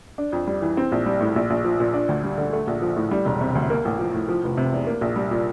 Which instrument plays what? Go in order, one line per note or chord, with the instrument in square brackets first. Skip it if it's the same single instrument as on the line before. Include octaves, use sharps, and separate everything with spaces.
[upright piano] D4
F2
G3
E3
C4
A#1
G3
A2
A#1
A#1
F3
A#2
D4
D2
G3
D3
A3
A#1
F3
A2
G3
E1
C3
D2
A#3
A1
F3
A2
F3
F1
C3
E2
A#3
A#1
G3
A#2